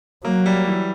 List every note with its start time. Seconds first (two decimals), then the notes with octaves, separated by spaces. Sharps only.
0.24 F#3 A#3
0.46 G3
0.68 E3